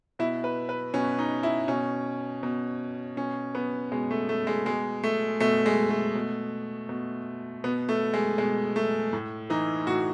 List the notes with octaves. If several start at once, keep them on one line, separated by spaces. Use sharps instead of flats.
B2 E4
B4
B4
B2 C#4
D#4
E4
B2 C#4
B2
B2 C#4
B3
B2 G#3
A3
A3
G#3
B2 G#3
A3
B2 A3
G#3
A3
B2
B2
B2 B3
A3
G#3
B2 G#3
A3
A2
E3 D#4
A2 F#4